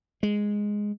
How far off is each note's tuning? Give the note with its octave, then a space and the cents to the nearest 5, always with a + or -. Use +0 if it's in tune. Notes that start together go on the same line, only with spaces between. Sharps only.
G#3 -5